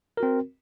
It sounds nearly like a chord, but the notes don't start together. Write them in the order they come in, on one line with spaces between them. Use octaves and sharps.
A#4 F#4 C4